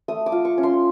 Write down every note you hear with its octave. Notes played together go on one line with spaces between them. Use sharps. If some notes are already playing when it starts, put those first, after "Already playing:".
A3 D#6
D6
F4
C#6
C#4
C6